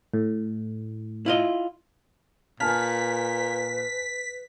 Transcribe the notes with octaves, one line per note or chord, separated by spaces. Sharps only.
A2
E4 F4 D#5
A#2 B4 G#5 A5 F6 B6